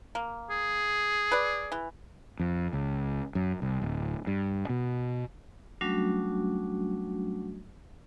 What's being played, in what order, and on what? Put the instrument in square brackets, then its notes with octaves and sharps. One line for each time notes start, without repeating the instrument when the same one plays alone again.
[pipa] A#3
[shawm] G#4
[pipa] B4 D5
E3
[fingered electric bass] F2
C#2
F#2
C2
D1
G2
B2
[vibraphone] F#3 G3 A3 C#4 D4 F#4